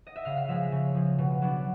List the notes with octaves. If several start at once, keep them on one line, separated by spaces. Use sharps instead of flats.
D#5
E5
C#3 F5
F5
F3 G#3 E5
C#3
F3 G#3
B2
F#3 B3 D4